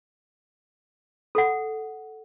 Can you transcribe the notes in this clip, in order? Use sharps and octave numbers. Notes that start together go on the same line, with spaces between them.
A4 F#5